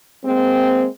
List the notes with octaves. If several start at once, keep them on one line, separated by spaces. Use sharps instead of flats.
G#3 A#3 C4